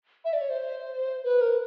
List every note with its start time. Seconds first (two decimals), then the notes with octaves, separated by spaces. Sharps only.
0.25 E5
0.33 D5
0.41 C#5
0.50 C5
1.24 B4
1.41 A#4